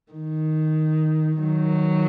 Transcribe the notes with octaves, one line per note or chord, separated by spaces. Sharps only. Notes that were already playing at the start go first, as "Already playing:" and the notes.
D#3
D#3 F#3